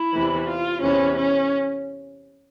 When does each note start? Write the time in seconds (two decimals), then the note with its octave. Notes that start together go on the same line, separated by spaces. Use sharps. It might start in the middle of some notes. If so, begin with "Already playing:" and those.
Already playing: E4
0.14 E2 C3 E3
0.48 F4
0.82 E2 C3 E3 C#4
1.17 C#4